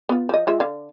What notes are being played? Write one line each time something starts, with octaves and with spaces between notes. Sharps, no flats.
B3 F4
F3 D#5
G#3 F4 E5
D3 F5